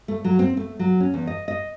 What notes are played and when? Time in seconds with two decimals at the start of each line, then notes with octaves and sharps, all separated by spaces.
0.08 A3
0.24 F#3
0.39 C4
0.57 A3
0.79 F#3
1.00 C#4
1.14 E2
1.27 D#5
1.48 D#5